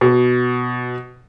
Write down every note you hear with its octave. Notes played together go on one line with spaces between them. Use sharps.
B2